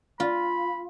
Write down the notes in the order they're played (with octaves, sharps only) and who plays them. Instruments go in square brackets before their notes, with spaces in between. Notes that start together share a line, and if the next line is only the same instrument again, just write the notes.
[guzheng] F4 [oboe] B5